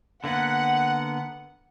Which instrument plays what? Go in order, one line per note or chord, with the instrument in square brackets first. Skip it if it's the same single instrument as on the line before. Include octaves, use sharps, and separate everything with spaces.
[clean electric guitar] D3 A#3 B3 [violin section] F#5